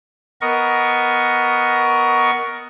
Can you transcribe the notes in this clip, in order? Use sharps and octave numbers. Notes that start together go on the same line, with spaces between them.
B3 A#4 D#5 C#6